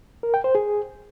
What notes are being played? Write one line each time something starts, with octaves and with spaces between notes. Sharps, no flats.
A#4
G5
C5
G#4